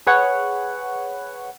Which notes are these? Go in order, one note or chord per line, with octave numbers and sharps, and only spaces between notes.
G#4 B4 C#5 F#5